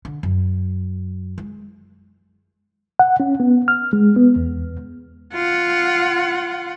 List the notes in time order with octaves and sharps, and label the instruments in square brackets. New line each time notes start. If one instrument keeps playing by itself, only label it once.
[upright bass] D3
F#2
G#3
[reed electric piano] F#5
C#4
B3
F6
G#3
B3
E2
[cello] F4 F#5